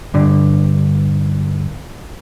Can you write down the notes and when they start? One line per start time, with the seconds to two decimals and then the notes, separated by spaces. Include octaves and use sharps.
0.14 G2 D3